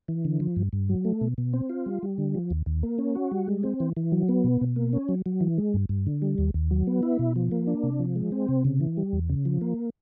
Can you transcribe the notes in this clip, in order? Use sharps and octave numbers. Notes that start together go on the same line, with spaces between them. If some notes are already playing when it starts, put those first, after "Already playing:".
E3
D3
F3
G2
G2
F#3
A3
B2
B2
C4
F4
G3
G3
D3
F3
D#2
D#2
A#3
C#4
F#4
G3
G#3
C4
E3
E3
F#3
B3
B2
B2
A#3
C#4
F#3
F#3
E3
G#3
G2
G2
D3
G3
D#2
D#2
F#3
B3
E4
B2
F3
A#3
D4
C3
F3
G#3
C4
C3
C#3
E3
G3
E2
C#3
F3
A#3